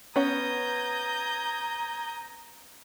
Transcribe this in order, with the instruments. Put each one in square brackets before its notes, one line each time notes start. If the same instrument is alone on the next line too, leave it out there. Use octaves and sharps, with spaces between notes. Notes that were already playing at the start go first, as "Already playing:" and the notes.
[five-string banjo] B3 C#4 [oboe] A#5 [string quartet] D#6 G6 G#6